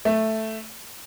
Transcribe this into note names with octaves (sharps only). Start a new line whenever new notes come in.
A3